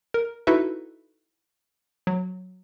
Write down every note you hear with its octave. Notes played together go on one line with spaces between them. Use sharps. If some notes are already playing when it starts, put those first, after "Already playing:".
A#4
D#4 E4 F#4 A4 B4 E5
F#3